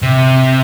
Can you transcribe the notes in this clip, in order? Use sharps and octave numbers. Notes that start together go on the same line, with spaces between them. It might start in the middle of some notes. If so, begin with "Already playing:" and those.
C3